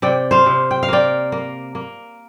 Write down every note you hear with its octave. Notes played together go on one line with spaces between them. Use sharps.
C3 D5 G5
C5 F5
C3
G5
F5
A#3 D5 G5
A#3
A#3